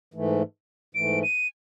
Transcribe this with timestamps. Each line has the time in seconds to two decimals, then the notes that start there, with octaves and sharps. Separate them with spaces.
0.14 G#2 E3 A3
0.95 G#2 E3 A3 D7
1.23 D#7